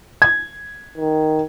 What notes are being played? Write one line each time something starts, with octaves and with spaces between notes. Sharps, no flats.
G#6
D#3